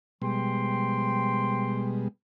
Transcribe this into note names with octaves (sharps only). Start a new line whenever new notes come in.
B2 F3 G3 G#3 G5 C6